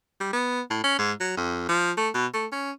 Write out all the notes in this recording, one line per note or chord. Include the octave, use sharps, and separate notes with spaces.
G3
B3
A2
C#4
G#2
F#3
F2
F3
A3
B2
A3
C#4